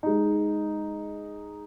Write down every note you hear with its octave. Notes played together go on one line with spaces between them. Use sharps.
G#3 D#4